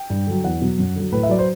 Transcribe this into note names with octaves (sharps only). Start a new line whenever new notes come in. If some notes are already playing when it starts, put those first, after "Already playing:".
Already playing: G5
G2
D3 F#3
E2 F#5
B2 F#3
F#2
D3 F#3
A2 B4
E5
F#3 D5
C5